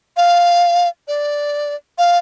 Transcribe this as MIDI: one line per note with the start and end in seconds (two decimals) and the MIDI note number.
0.17 0.88 77
1.08 1.75 74
1.98 2.18 77